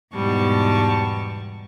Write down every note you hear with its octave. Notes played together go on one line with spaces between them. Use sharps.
E2 G#2 B2 G3 A5 C#6